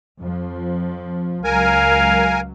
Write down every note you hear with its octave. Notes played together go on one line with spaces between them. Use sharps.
F2 F3
C#2 F#3 A#4 F5 G#5